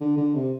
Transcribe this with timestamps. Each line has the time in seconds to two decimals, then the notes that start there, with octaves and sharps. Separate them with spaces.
0.01 D3
0.17 D3
0.35 C3